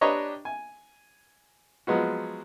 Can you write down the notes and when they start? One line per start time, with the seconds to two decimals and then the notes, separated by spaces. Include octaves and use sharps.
0.01 D4 G4 B4 C#5 D#5 A#5
0.45 G#5
1.87 F3 F#3 G#3 B3 F#4